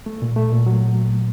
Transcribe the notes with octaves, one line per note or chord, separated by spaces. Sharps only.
A3
A#2
A3
A#2
F#3